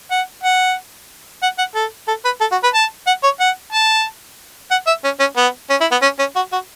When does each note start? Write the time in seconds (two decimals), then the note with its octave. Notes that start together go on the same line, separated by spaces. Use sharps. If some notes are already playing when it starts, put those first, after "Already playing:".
0.11 F#5
0.44 F#5
1.43 F#5
1.59 F#5
1.75 A4
2.08 A4
2.25 B4
2.41 A4
2.52 F#4
2.64 B4
2.75 A5
3.07 F#5
3.24 C#5
3.40 F#5
3.73 A5
4.71 F#5
4.87 E5
5.04 C#4
5.20 C#4
5.37 B3
5.70 C#4
5.81 E4
5.91 B3
6.02 C#4
6.19 C#4
6.36 F#4
6.52 F#4